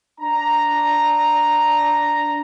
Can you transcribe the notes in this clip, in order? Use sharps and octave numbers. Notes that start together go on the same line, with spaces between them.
D4 A#5